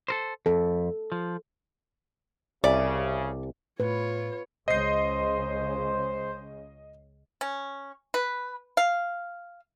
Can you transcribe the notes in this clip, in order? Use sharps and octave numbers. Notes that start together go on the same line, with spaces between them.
A4 A#4 C5
F2 A4
F3
C2 C#3 D5 E5 G#5
A2 F4 B4 C#5
C#2 C#3 C5 D#5 C7
C#4
B4
F5